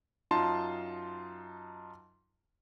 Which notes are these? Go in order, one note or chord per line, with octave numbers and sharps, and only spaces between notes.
F#2 D#4 F4 A5 C6